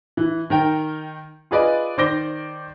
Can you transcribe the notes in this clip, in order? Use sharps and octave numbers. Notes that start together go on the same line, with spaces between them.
E3
D#3 A#4 G5
F4 G#4 B4 D5 D#5
D#3 C5 D5 D6 A#6 G7